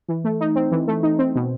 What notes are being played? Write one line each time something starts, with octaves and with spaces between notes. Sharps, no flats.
E3
A3
D#4
C4
E3
A3
D#4
C4
B2